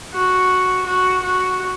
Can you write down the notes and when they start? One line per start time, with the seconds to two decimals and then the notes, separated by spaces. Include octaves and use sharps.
0.14 F#4
0.86 F#4
1.23 F#4